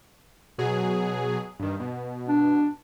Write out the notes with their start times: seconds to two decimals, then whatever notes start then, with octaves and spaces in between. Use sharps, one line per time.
0.58 B2 F#3 G#4
1.60 G2 D#3
1.80 B2
2.29 D4